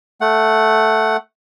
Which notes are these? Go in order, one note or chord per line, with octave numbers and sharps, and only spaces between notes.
A3 F#5